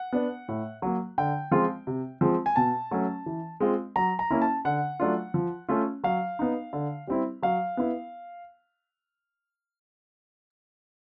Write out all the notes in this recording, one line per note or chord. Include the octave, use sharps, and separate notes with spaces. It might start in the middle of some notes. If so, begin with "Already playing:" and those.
Already playing: F#5
B3 D4
A2
F#3 A#3
D3 G5
F3 G#3 C4 F4
C3
F3 G#3 C4
G#5
B2 A5
F#3 A3 C#4
E3
G#3 C4 F4
F#3 A#5
A#5
A#3 C#4 E4
A5
D3 F#5
F#3 A3 D4 F4
F3
A3 C#4 F4
F#3 F5
B3 D#4
D3
G3 C4 E4
F#3 F5
B3 E4